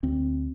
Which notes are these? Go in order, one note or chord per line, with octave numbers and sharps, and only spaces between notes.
D2 C4